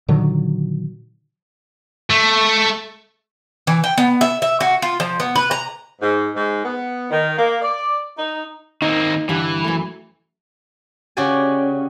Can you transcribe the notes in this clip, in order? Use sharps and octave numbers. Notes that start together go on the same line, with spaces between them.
A#2 D3 D#3 F#3
A3
E3
G5
B3
E5
E5
F#4
F4
F3
B3
B4
A#5
G#2
G#2
B3
D#3
A#3
D5
D#4
D#3 A#3 C4 D#4
G2 D3 E3 G3
F#2 A3
C#3 F#4 G4 D5 G#5